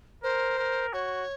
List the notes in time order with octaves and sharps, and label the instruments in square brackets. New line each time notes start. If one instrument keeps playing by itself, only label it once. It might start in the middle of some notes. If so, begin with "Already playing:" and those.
[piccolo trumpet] A#4 [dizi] C5
[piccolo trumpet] A#4
[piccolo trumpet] F#4 [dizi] C#5